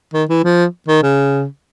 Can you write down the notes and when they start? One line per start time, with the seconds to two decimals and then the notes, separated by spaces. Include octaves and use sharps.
0.14 D#3
0.29 E3
0.44 F3
0.88 D#3
1.03 C#3